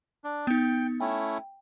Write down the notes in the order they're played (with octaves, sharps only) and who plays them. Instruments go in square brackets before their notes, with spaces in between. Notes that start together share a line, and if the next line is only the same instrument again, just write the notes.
[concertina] D4
[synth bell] B3 D#4 [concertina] G5
[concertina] A3 C#4 E4 [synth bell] G5